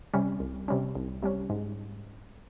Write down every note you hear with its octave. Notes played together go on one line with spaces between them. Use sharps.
C3 G3 C#4
C2
C3 G3 C#4
C2
C3 G3 C#4
G#2